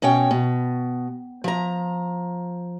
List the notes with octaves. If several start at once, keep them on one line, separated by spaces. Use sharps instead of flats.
B2 C#4 C#5 G5
B2
F3 A#5